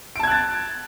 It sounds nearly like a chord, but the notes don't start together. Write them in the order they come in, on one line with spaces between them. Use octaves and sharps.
D7 A5 G#6 F#6 A6